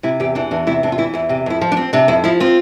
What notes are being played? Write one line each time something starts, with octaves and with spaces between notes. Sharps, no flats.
C3 E4
E2 G4
E3 D4
E2 D4
C3 E4
E2 D4
F4
E3 E4
E2 E4
C3 G4
F2 E4
F3
D4
C4
C3 D4
F2 E4
F3 E4
C4 F4